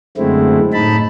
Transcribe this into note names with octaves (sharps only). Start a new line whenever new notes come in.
F#2 D3 G#3 A3 C4 E4
A2 D#4 A5 B5